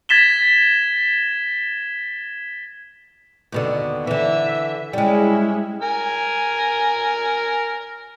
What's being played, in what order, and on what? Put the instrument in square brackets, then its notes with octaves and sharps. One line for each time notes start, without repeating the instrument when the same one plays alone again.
[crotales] G#6 A6 B6 E7 G7
[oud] D#2 B2 D3
[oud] D3 E3 [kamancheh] E5
[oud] G3 G#3 [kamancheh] C#4 E4
[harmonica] A#4 G#5